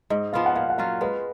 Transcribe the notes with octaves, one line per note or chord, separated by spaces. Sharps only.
G#2 D#5
F3 B3 F4 F5
F#5
A#2 F5
F#5
F#3 C#4 F4 F5
G#3 B4